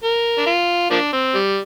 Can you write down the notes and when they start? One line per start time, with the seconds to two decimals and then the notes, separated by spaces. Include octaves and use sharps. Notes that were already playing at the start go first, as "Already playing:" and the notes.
0.04 A#4
0.38 D4
0.47 F4
0.91 F3 A#3 D4
1.13 C4
1.35 G3